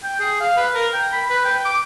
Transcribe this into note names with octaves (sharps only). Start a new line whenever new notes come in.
G5
G#4
F5
B4
A#4
G5
B5
B4
G5
D6